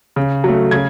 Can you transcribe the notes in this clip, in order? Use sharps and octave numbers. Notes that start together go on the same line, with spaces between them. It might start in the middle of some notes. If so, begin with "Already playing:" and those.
C#3
F#3 A3
C#3 G#6